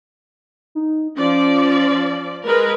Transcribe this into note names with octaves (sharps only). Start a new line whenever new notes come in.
D#4
F3 C#4 D5
G#3 A#4 B4